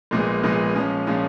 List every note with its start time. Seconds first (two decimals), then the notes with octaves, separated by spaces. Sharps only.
0.11 A#1 A#2 G#3 B3
0.43 A#1 A#2 G#3 B3
0.75 A#2 F3 G#3 C#4
1.07 A#2 F3 G#3 C#4